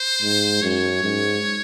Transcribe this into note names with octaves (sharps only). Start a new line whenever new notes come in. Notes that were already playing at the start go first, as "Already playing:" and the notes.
Already playing: C5
G#2
F#2 C#5
G#2